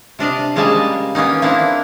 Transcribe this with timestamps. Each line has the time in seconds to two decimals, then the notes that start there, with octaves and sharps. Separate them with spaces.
0.19 C3 D4 D#5 F5
0.55 C#3 G3 G#3 A#3 G#5 A5
1.15 A#3 B3 C#4 D#4
1.42 A#3 C4 D4 E4